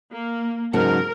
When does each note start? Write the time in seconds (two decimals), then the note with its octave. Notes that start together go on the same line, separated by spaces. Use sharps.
0.11 A#3
0.73 G#2 C#3 F#3 A#4 A5